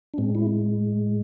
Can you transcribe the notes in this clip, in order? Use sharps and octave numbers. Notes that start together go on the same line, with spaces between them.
D4
A2 G#3 C4
E4